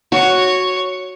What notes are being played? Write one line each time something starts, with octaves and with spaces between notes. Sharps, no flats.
F#4 C#5